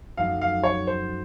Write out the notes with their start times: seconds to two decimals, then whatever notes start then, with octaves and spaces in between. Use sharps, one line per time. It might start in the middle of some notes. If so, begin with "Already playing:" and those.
0.17 F#2 F3 A3 D#4 F5
0.41 F5
0.63 C#5
0.87 C5